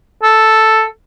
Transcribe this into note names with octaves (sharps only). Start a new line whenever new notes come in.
A4